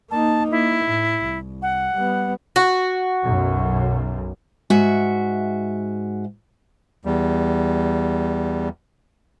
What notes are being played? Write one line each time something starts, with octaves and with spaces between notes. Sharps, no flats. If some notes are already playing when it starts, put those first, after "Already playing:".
A#3 D#4 A5
A#3 E4
A2
C2
F#5
G3 B3
F#4
B1 F#2
G#2 F#4 E5
E2 G3